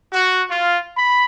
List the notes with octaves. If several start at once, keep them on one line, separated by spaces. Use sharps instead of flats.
F#4
F4
B5